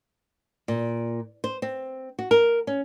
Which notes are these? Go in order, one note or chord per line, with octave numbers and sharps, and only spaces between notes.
A#2
C5
C4
F#4
A#4
C#4